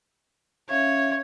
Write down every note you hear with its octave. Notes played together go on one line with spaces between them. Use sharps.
C#4 C#5 E5 F5